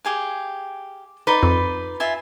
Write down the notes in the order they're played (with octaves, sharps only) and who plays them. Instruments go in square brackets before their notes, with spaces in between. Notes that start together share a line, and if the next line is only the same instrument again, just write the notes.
[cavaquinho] G4 G#4 F5
[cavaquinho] D#4 D5 C6 [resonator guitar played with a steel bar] B4
[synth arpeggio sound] F2
[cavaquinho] F4 E5 G#5